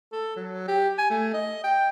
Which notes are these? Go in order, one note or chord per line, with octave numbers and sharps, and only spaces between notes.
A4
F#3
G4
G#5
A3
D#5
G5